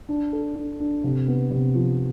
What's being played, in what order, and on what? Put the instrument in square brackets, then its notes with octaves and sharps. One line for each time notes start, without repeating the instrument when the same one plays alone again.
[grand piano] D4
A4
D4
D4
C3
B3
C3
F3